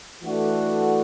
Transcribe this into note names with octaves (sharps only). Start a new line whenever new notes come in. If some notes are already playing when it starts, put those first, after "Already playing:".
E3 A3 D4 F#4 A4